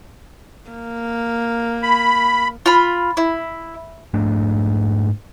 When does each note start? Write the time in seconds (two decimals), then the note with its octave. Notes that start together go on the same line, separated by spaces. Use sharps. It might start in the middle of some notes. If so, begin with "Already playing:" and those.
0.71 A#3
1.82 B5
2.66 F4 B5
3.17 E4
4.14 G#2 A3 D4